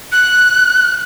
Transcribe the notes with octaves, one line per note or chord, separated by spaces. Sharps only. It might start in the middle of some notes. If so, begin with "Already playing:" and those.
F#6